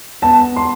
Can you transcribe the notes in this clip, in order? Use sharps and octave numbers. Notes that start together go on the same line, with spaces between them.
B3 A5
C6